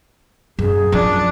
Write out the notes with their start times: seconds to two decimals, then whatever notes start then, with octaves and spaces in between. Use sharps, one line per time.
0.59 F#2 G#4
0.92 F#2 F3 D4